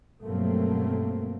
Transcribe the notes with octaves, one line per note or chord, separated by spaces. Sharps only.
G2 B2 F#3 A3 A#3 C4